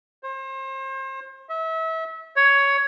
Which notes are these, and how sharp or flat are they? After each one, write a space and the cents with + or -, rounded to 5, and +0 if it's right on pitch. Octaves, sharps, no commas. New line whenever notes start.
C5 +35
E5 -30
C#5 +10